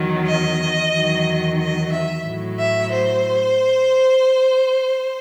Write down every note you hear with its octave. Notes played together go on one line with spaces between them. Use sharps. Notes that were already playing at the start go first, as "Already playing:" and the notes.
Already playing: E2 D#3 F#3
D#5
E2 D#3 F#3
D#5
E5
A2 F#3
E5
C5